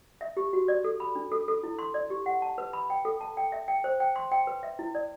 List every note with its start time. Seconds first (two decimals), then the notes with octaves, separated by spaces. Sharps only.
0.21 E5
0.37 G4
0.53 F#4
0.68 D5
0.84 A4
1.00 B5
1.15 D4
1.32 A4
1.48 A4
1.63 E4
1.79 C6
1.94 D5
2.10 G4
2.26 F#5
2.42 A5
2.58 B4
2.73 B5
2.90 G5
3.05 A4
3.21 A5
3.37 G5
3.52 E5
3.68 G5
3.84 C5
4.00 G5
4.16 C6
4.31 G5
4.47 B4
4.63 E5
4.79 E4
4.95 D5